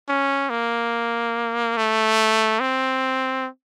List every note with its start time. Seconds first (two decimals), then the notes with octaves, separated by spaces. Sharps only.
0.09 C#4
0.50 A#3
1.77 A3
2.60 C4